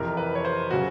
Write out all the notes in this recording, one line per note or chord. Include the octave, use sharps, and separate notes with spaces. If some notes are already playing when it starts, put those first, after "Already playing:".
Already playing: F2 C3 E3 A#4
B4
C#5
C5
C#3 F#3 F#4